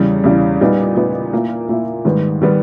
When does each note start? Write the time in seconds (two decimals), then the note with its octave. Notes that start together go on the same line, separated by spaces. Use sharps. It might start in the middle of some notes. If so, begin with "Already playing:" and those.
Already playing: E2 C#3 G3
0.24 E2 C#3 G3
0.61 A#2 G3 B3 D#4
0.96 A#2 G3 B3 D#4
1.33 A#2 A#3 E4
1.69 A#2 A#3 E4
2.05 G#2 D#3 G3 B3
2.42 D#3 G3 B3